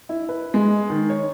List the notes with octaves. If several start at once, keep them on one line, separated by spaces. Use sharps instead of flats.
E4
B4
G#3
D#3
C#5